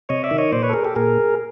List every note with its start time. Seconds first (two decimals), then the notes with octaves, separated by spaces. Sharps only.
0.09 C3 C#5 D#5
0.24 D5 E5
0.31 D#3
0.38 C#5 D#5
0.52 A#2 C5 D5
0.63 B4 C#5
0.69 A4
0.73 G#4 A#4
0.84 G4 A4
0.95 A#2 G#4 A#4